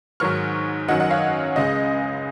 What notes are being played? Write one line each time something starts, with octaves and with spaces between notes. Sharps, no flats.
G#2 D#3 F#3 C#6 F6
F#2 D#3 F#3 D#5 F#5
D#5 F#5
C#5 F5
C#2 C#3 G#3 D#5